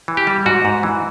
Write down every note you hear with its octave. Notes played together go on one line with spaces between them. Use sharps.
E3
G4
G3
G#2 F#4
G#2
E3